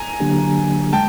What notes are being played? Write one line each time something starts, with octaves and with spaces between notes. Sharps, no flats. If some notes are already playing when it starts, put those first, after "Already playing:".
Already playing: G#5 A#5
D3 F#3 A#3 D4 G4
G#3 G5 A5